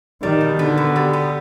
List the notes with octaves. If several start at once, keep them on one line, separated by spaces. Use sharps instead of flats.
D#3 G3
B2
D3 B3
B2
G3
B3